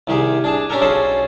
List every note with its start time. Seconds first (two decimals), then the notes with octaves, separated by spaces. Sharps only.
0.07 C2 D#3 G4 G#4
0.44 D4 G#4 A5
0.70 C#4 D4 G4 A4 A#4
0.81 B1 C#4 G#4 A4 C5